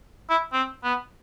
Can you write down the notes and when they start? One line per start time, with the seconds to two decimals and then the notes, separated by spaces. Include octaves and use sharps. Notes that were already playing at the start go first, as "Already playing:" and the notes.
0.29 E4
0.53 C4
0.84 B3